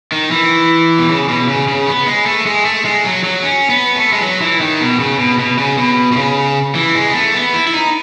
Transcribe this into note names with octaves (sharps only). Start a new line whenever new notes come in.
D#3
E3
B2
C#3
B2
C#3
C#3
B3
G#3
A3
G#3
A3
G#3
F#3
F#3
C#4
B3
A3
G#3
F#3
E3
D#3
B2
C#3
B2
B2
C#3
B2
B2
C#3
E3
G#3
B3
A3
B3
E4
E4
D#4